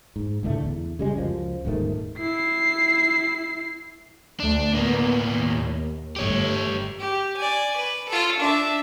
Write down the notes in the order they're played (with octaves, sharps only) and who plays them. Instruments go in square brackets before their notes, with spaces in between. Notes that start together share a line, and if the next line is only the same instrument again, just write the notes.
[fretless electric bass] G#2
C#2 A2 D3 A3
E2
C#3 G3 G#3
C#2 F#2 F3
D#1 G#2 D#3 A3
[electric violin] E4 C7
[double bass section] D2 A3 [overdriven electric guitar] D4
[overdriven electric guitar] A2 A#3 [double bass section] B3
[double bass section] D#2
[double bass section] G1 A3 [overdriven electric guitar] G4 C#5
[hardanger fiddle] G4
D5 G#5
B4
F4 A4
D4 E5